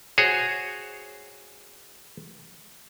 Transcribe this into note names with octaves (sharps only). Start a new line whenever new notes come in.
F#4 G#4 C5 C#5